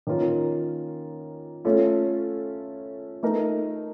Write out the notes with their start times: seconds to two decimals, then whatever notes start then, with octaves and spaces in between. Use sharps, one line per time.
0.07 D#3 A#3 C#4 F4 A#4
1.65 A3 C#4 F4 A4
3.23 A3 D#4 A#4